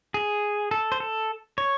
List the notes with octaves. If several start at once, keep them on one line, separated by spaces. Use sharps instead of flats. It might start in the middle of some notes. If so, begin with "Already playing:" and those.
G#4
A4
C5
A4
C#5